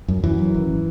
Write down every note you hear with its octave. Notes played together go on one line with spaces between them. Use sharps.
F#2
F#2 E3
F#2
G#1